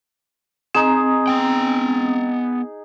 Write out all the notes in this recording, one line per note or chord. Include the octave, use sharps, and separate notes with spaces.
C4 D#4 G#4
B3 G5